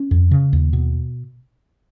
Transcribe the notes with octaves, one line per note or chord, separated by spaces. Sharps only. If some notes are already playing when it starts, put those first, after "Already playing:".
Already playing: C#4
F2
C#3
D#2
B2